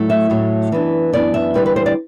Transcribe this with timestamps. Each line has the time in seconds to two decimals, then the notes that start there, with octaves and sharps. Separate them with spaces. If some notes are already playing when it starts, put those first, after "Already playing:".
Already playing: A2 F#3 A3
0.10 E5
0.30 A2 F#3 A3
0.72 F#2 E3 B3 D4
1.12 F#2 E3 B3 D4 D5
1.34 E5
1.54 E2 D3 G3 C4 B4
1.66 B4
1.76 C5
1.86 D5